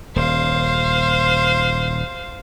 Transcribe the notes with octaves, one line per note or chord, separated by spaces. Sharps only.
D#1 C5 F5